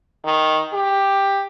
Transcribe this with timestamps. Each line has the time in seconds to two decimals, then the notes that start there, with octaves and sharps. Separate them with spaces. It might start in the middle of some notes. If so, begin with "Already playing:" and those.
0.24 D#3
0.73 G4